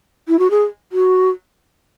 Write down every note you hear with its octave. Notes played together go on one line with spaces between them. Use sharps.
E4
F#4
G#4
F#4